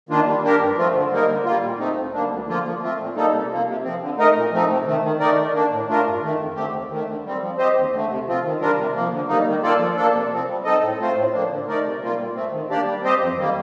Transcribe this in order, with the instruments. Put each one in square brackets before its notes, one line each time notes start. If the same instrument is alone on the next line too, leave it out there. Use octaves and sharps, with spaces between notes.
[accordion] D#3 A#3 D4 F4
G3
A#3 D4 G4 A#4
G2
F3 A3 C4 F4
D3
G3 A#3 D#4 A#4
D3
G3 A#3 F4
A#2
A3 C4 D#4
D2
D3 G3 A#3 D4
D2
D3 F3 A#3 F4
F3
A3 C4 F4
A#2
G3 A#3 D#4 A4
C3
F3 A#3
C3
F3 C4
D3
A3 D#4 A#4 D#5
A#2
F3 A3 C4 D#4
C3
D#3 A3
D#3
A3 D#4 A#4 D5
D#3
A#3 D4
A2
A3 D4 F4 A#4
G2
D#3 A3
F2
D3 A3 C4 G4
D#2
D#3 A3
D3
G3 C4
F3
C4 G4 C5 D#5
D#2
D3 A3
C3
F3 C4 F4
D#3
G3 D4 F4 A#4
C3
F3 A#3
D3
G3 A#3 D#4
D#3
A#3 F4 A4 D5
F3
A#3 D4 A4
C3
F3 C4
G3
C4 D#4 A4 D#5
A2
A3 C4 F4 C5
A2
F3 A#3 D4
D3
A3 D#4 A#4 D5
C3
G3 A#3 F4
A#2
A3 C4
D#3
A#3 D4 G4 D5
G3
C4 G4 C5 D#5
F2
D#3 G3 A#3